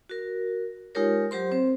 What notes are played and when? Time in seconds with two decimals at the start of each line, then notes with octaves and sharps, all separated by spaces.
0.09 F#4 A#4
0.95 G#3 D#4 F4 G4 A#4 C#5
1.31 F#3 G4 C5 C6
1.51 C4 C5